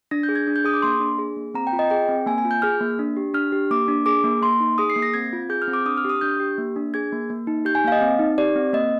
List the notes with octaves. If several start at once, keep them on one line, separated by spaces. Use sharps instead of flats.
D4 A#6
G6
G#4
G#6
D4
G6
G#4 D#6
D6
A#3 C6
D4
G#4
A#3
C4 A#5
G5
F4
D#5
G#4 G5
C4
A#3 G#5
G#5
F4
G6
G#4 F6
A#3
D4
G4
D4 F6
G4
A#3 D6
D4
G#4 D6
A#3
A#3 C6
D#4
G#4 D#6
C7
A#3
A#6
C4 G#6
F4
G#4 G6
F6
C4
D6
D4 D#6
F6
G4 D#6
D4 G6
G4
A#3
D4
G#4 G#6
A#3
A#3
D#4
G4 G6
G#5
A#3 F5
D#5
C4
D#4
G4 D5
C4
A#3 D#5